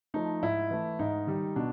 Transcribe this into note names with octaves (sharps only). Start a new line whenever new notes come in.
F3 A3 D#4
G#2 E4
E3 A3
G#2 D#4
D#3 G3
B2 D4